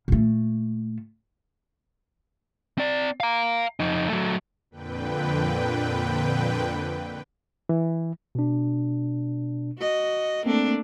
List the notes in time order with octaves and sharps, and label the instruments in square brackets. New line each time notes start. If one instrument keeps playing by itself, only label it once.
[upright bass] A#2 A3
[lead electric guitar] C4 D5
F5 A#5
F2 D#4
F#3 A3
[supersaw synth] F2 A#2 D3 B4 G5
[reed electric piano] E3
[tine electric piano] B2 D4
[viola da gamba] F#4 D#5
[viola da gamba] A3 A#3 D4 [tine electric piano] C4